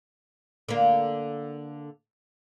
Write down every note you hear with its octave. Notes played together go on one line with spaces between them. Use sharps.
D3 A#3